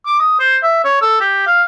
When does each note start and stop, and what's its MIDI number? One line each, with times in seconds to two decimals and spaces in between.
0.06 0.19 86
0.20 0.38 87
0.40 0.58 72
0.63 0.81 76
0.84 0.99 73
1.02 1.20 69
1.21 1.43 67
1.47 1.63 77